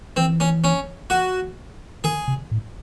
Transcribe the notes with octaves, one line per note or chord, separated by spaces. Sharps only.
E3 C4
C#4
C#4
F#4
D#3 G#4
C3
A2